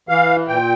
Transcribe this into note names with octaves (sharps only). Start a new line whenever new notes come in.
E3 F5
A#2 G5